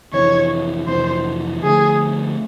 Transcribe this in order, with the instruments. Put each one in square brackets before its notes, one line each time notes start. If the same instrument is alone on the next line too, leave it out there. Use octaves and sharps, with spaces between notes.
[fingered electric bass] F2 C3 E3 [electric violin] C#5
[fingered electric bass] F2 C3 E3 [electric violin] C5
[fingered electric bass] D3 F3 A3 [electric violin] G#4